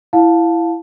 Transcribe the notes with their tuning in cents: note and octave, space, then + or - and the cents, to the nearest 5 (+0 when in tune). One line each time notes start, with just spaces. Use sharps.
E4 +15 F5 +20 A5 +0